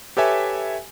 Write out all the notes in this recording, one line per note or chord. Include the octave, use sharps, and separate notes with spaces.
G4 A4 B4 C#5 E5 G#5